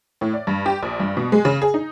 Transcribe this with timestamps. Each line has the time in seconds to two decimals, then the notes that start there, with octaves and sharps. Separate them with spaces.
0.21 A2
0.33 D5
0.47 G2
0.66 G4
0.83 A#1
1.00 G2
1.17 B2
1.32 G#3
1.45 C#3
1.62 G#4
1.74 D#4